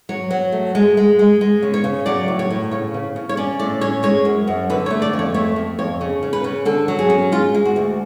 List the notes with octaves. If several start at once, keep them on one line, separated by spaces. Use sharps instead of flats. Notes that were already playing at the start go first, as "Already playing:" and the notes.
F#3 C#5
F#3
A3
G#3
G#3
G#3
G#3
C#3
C#5
C#3
F#3 D5
A2
C#5
A2
C#3 C#5
C#3
C#3
C#5
C#4 D5
A2 D5
C#4 C#5
G#3 C#5
F#2
F#2
D3 B4
C#5
A3
D5
F2
C#5
A3 C#5
F2
F2 C#5
C#3
C#3
B4
C#3
D3 A4
F#3
G#4
C#4
G#3 F4
G#3
F#4
D2